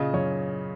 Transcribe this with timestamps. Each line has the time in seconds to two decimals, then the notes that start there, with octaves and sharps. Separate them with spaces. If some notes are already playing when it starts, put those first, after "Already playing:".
Already playing: A#2 C#3 D#5
0.14 F#2 C#5